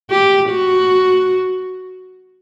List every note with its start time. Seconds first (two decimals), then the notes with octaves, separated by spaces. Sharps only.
0.11 G4
0.50 F#4